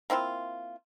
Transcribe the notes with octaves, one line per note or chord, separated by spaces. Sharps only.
A#3 C4 E4 F4